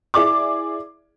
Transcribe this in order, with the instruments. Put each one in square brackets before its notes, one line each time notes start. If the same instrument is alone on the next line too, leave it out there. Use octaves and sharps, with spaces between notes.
[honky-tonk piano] E4 G#4 D5 D6